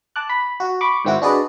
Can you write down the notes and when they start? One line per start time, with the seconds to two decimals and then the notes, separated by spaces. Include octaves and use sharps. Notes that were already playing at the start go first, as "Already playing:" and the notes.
0.16 A5 D6 F#6
0.29 B5
0.60 F#4
0.81 B5 C#6 D6
1.05 G#2 D#3 C4 E4 F#4
1.22 D4 F#4 G#4 B4 D5 D#5